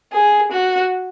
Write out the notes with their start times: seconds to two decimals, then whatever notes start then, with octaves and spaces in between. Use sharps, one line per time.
0.13 G#4
0.52 F#4